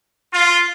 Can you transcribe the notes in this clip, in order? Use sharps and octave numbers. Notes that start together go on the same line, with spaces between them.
F4